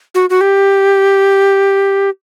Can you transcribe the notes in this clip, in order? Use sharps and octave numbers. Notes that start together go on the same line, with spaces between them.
F#4
F#4
G4